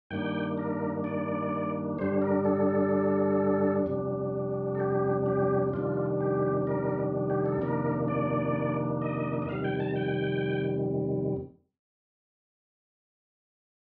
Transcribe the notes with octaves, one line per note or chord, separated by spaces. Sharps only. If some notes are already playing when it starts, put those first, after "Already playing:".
G2 D#3 A#3 D4 G5
A#4
D5
G2 D3 G3 D4 C5
A#4
A4
F2 C3 G3 D4
A4
G4
G4
F2 C3 D#3 G3 D4 F4
G4
A#4
G4
A4
F2 C3 D#3 A#3 D4 A#4
D5
D#5
D#5
F2 C3 D#3 G3 F5
G5
A5
G5